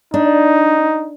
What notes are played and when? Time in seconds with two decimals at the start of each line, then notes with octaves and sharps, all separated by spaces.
0.14 D4 D#4